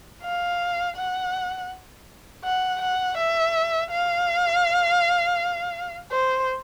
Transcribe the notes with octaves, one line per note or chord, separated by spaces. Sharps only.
F5
F#5
F#5
F#5
E5
F5
C5